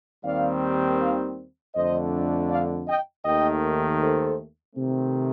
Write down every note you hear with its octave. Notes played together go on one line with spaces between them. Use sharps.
D#2 D#3 G3 C4 D5 F5
D5 F5
F2 D3 A3 D4 C5 D#5
D5 F5
D#5 G5
D#2 D#3 A3 D#5 G5
A4 C5
C3 D#3 A3 C4